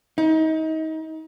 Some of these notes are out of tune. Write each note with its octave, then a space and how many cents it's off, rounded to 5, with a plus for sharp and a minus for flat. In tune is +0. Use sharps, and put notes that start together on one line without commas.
D#4 +30